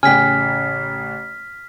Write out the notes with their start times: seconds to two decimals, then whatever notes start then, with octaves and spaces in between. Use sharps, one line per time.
0.03 A1 C#3 G5 G#5 F6 B6